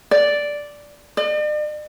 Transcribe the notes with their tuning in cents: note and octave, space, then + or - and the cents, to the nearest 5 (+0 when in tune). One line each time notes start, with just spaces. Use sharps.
D5 -5
D5 +45